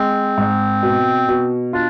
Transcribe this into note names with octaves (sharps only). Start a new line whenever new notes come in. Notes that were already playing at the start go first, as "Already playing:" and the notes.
Already playing: G#3 C4
G#2
B2
B2
D4 F4